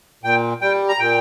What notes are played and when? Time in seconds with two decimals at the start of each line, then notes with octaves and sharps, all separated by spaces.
0.24 A#2 G5
0.62 G3 G5
0.89 A#5
0.99 A#2 G5